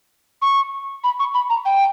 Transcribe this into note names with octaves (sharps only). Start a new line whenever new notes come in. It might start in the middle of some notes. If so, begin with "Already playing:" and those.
C#6
B5
C#6
B5
A#5
G5